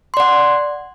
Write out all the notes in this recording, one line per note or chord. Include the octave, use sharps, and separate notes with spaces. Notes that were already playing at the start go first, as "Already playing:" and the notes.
D5 F#5 C6